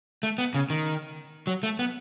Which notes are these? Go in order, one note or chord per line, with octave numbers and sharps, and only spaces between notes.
A3
B3
C#3
D#3
F#3
A3
B3